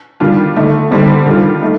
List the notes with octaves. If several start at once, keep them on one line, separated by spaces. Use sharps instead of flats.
D#3 G3 D4 F4
D3 A3 D#4
D3 G3 C4 D#4
D#3 G3 D4 F4
A3 D#4